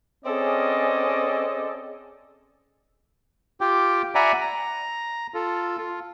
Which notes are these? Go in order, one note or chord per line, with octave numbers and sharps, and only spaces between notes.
C4 C#4 G#4 A4 D5 D#5
F4 G4 G5 D6
D5 E5 F#5 G#5 A#5 B5
A#5
F4 A4
F4